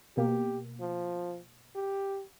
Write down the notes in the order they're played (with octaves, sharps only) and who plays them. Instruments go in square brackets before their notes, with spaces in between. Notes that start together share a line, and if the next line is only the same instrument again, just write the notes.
[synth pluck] B2 A#3 [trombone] G4
[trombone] F3
G4